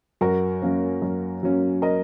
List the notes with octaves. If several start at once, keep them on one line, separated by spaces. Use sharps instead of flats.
F#2 F#4 A#4
F#3 A#3 C#4
F#2
F#3 A#3 C#4
A#4 D#5